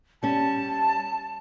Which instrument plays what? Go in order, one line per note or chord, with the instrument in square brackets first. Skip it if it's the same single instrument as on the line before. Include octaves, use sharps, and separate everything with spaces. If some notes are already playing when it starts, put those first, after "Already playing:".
[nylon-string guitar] G3 C#4 [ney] A5